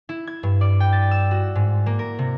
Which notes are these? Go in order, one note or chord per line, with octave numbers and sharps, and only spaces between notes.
E4
G#6
G2
D5
G5
A6
E6
F#4
G#2
A#3
A#4
C3